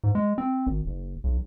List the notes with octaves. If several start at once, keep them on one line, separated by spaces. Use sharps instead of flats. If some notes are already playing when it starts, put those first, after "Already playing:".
G#2
G#3
C4
G#1
F#1
B1